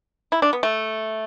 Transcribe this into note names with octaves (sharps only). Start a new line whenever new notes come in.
E4
D4
B3
A3